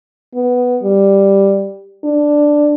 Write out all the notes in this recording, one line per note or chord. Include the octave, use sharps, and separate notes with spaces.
B3
G3
D4